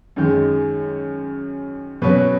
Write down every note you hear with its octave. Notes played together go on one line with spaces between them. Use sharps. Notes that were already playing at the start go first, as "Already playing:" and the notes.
F#2 D#3 G#3
B2 F#3 C#4 B4